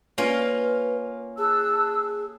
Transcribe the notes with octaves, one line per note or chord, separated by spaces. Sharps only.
A#3 C#4 F4 B4
G#4 A5 E6 F#6